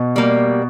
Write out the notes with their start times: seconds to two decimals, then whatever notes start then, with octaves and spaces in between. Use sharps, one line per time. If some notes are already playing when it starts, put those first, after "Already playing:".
Already playing: B2
0.16 G3 A#3